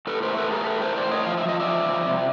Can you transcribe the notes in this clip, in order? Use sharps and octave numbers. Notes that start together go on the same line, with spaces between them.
A2 A4 B4
A3 A#4 C5
A4 B4
A3
G#4 A#4
A2 A4 B4
A#4 C5
A2
C5 D5
A3
C#5 D#5
F3 F5
E5
F3 D#5
D5 E5
F3
F3
C3